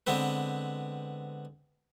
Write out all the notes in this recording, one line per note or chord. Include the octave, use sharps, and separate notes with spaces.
D3 G#3 B3 C4 B4